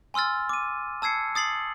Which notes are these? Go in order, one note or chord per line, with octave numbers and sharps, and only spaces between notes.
G#5 C6 E6 F6 A6
D6 D#7
A5 E6 G#6 C7 C#7
D#6 A6 C7 F#7